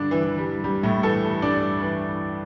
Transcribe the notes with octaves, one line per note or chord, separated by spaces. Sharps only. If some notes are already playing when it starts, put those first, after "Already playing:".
Already playing: G2 D3 D4
E3
E3
G3
G2 G3
A2 A3
E3 A3 A4
G2 D4 D5
E3